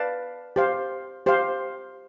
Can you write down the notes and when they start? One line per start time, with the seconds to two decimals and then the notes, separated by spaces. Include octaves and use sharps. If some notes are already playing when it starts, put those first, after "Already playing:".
Already playing: B4 D5 F5 A5
0.56 G4 C5 F5
1.26 G4 C5 F5